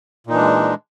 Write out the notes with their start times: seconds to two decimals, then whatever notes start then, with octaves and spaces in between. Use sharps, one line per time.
0.27 A#2
0.30 D#4
0.33 E3
0.36 D4
0.39 G#3